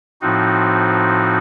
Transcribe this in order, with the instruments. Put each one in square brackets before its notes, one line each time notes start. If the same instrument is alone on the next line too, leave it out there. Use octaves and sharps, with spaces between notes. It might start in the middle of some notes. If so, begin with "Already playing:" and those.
[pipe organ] A2 F3 C4 D#4 F#4